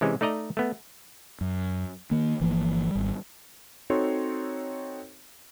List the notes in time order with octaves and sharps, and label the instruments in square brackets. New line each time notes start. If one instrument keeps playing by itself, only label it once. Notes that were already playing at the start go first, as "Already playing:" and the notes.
[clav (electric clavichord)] C3 E3 G#3 C#4
A3 D#4 D5 D#5 A#5
A3 B3
[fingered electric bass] F#2
D#3 A#3
G1 E3 F3 A#3
G#1 G3
[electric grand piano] C4 D#4 F#4 A4 C#5 C6